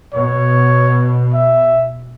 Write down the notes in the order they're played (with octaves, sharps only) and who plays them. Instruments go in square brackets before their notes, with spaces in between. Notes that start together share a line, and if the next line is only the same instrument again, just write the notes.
[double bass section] B2 [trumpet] C#5
[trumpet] E5